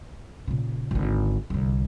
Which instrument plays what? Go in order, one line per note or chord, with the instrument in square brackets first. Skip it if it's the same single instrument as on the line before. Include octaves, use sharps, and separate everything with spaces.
[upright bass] A#2 C#3
G#1 D3
C2 D3